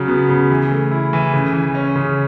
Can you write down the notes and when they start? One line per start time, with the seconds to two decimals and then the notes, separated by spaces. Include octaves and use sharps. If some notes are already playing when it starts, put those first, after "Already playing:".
Already playing: C#3 F#3
0.08 B3
0.29 C#3
0.51 E3
0.72 A3
0.91 E4
1.13 E3
1.33 C#3
1.54 E3
1.75 C#4
1.96 C#3